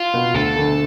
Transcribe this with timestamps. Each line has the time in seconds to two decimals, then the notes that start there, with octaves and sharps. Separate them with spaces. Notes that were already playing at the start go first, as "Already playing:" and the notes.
Already playing: F4
0.14 B2 B3
0.34 D2 A4
0.55 D3 A3